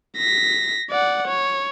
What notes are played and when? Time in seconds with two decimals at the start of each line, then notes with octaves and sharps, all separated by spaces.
0.18 A#6 B6
0.90 D5 F#5
1.27 C#5